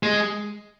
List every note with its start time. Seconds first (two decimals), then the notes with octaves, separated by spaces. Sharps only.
0.03 G#3